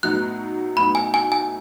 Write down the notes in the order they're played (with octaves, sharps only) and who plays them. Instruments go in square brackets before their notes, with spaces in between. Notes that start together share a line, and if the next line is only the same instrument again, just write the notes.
[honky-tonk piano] A2 F#3 B3 D#4 [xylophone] F#6
[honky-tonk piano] A2 F#3 B3 D#4 [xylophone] B5
[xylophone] G#5
G#5
G#5